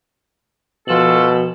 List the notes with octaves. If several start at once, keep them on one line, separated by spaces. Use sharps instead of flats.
B2 F3 F4 F#4 A4 E7 F#7